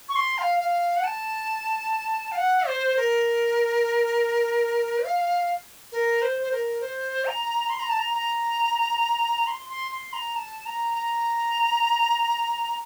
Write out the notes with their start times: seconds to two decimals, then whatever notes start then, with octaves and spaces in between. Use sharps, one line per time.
0.08 C#6
0.15 C6
0.38 F5
0.60 F5
0.96 F#5
1.04 A5
2.31 F5
2.37 F#5
2.66 C5
2.96 A#4
5.04 F5
5.92 A#4
6.22 C5
6.42 C5
6.51 A#4
6.81 C5
7.25 A#5
7.69 C6
7.79 A#5
7.89 A5
7.99 A#5
8.14 A#5
9.47 C6
9.69 C6
9.91 C6
10.13 A#5
10.36 A5
10.66 A#5
10.95 A#5